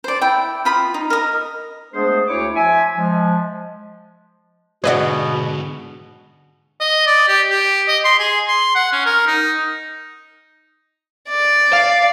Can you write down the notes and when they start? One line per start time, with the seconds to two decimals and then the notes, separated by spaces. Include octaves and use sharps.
0.04 C5 D5
0.21 E4 G5
0.65 F4 B5 D#6
0.94 D#4
1.10 A#4 D#5
1.94 G#3 A3 B3 D4 G#4 C5
2.27 D2 E4 C#5 D6
2.56 F3 E5 G#5
2.97 F3 G#3
4.84 G#2 B2 D3 F#4 G#4 B4 D5 D#5
6.80 D#5
7.06 D5
7.28 G4
7.51 G4
7.88 D#5
8.04 C6
8.19 G#4
8.48 C6
8.75 F#5
8.93 C#4
9.06 A#4
9.27 D#4
11.29 D5
11.73 F5